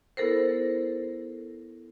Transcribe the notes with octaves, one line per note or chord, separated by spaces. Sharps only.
B3 E4 A4 A#4 C5